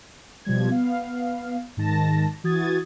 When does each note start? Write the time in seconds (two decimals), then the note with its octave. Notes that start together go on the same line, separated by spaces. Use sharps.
0.45 B2 F3 G3 G#6
0.70 B3 F5
1.77 G#2 D#3 A5 A#6
2.44 E3 F#4 D#6 G#6 A6